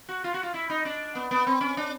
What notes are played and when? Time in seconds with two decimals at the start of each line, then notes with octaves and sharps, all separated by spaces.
0.09 F#4
0.24 F4
0.34 F#4
0.43 F4
0.54 E4
0.70 D#4
0.85 D4
1.15 B3
1.31 B3
1.47 C4
1.61 C#4
1.77 D4